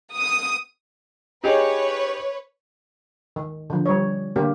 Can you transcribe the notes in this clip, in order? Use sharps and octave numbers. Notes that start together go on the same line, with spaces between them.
D#6
D#4 G4 G#4 B4 C#5
D#3
D3 F3
G3 C#5
D3 A#3 G4